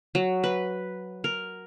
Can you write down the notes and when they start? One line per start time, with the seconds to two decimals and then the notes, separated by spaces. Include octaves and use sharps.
0.15 F#3
0.44 B4
1.24 A#4